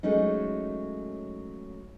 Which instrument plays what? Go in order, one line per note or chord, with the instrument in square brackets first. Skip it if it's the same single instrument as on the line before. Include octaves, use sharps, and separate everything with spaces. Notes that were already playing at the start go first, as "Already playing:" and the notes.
[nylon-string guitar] F#3 G#3 A3 C#4 D#4